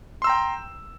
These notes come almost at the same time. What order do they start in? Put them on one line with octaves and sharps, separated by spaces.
C6 E6 A#5 G5